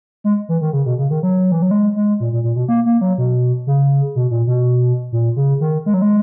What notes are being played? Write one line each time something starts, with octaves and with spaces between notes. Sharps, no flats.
G#3
E3
D#3
C#3
B2
C#3
D#3
F#3
E3
F#3
G#3
G#3
A#2
A#2
A#2
B2
A#3
A#3
F#3
B2
C#3
B2
A#2
B2
A#2
C#3
D#3
G#3
F#3
G#3